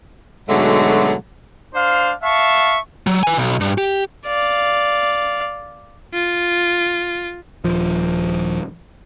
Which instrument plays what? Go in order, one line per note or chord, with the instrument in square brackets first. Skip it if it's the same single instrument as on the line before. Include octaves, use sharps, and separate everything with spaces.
[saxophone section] G#2 B2 D3 F#3 G#3 A3
[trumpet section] D4 C5 F5
E5 F5 A5 C#6
[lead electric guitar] F#3
B4 G#5
B1
G2
G4
[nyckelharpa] D5 F5
[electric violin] F4
[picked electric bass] D#1 F3